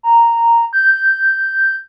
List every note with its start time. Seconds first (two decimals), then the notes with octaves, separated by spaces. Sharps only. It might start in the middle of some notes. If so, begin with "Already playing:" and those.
0.03 A#5
0.73 G6
0.91 G6